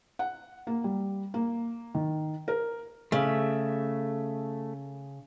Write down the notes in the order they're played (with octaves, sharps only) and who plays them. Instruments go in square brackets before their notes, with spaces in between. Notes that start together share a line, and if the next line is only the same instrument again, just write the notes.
[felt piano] F#5
A#3
G3
A#3
D#3
A#4
[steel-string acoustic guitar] C#3 [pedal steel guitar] A3 E5